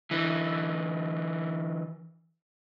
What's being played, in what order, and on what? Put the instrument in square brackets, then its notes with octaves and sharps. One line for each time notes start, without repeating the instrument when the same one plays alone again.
[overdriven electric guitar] D3 E3